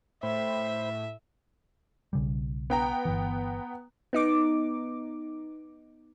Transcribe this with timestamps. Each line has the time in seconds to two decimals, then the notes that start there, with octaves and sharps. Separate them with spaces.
0.23 A2 C5 E5 G5 B5
2.13 B1 C#3 G3
2.70 B3 G5 A#5
3.05 G1 E3
4.13 B3 D#4 D6